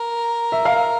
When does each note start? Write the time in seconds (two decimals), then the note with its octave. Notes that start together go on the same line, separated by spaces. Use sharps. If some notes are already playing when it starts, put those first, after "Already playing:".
Already playing: A#4
0.52 E5
0.65 F5